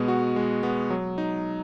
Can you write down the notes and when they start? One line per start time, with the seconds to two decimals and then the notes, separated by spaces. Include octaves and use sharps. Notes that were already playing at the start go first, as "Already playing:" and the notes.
Already playing: B2 G#3 B3
0.08 F#4
0.36 G#3
0.63 B3
0.90 F#3
1.18 D#4